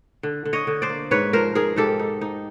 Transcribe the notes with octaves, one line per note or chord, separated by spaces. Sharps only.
D3
D3
C#5 D#5
D3
C5 D5
A#3
G#2 B4 C#5
F3 A#4 C5
G#2 G#4 A#4
G#2 G4 A4
D#4
D#4